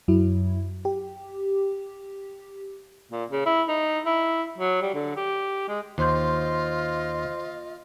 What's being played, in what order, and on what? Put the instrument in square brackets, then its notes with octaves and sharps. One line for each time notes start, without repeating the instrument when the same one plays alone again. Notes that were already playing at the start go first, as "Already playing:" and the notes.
[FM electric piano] F#2 F#3 E4
G4
[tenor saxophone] A#2
C#3
E4
D#4
E4
F#3
G3
D3
G4
G#3
[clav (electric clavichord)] D#2 [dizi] F4 [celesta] C5 C6 G6 [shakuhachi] D#5